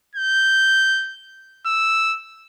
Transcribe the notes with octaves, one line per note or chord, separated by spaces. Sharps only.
G6
E6